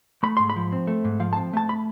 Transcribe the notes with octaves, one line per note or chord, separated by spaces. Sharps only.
A3 B5
G#2 C6
B5
F3
C4
A3
G#2
F3 F5
A5
C4
A3 A5
B5